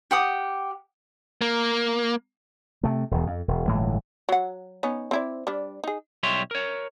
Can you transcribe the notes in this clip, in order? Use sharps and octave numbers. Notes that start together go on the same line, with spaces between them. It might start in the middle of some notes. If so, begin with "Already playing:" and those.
G4 F#5 D#6
A#3
C3 A3
E1 E2
F2
E1
G1 A2 E3 G#3
F#3 F#5
B3 C#4 D#4
C4 E4 D5
G3 D4
D#4 G#4
B1 G3 C#5 E5 C6
A#4 C#5